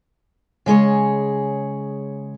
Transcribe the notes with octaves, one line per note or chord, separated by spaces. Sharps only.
C#3 G#3 G#4 C#5